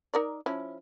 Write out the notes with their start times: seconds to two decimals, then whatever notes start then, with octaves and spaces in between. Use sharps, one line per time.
0.14 D#4 A#4 D5
0.46 F3 C#4 E4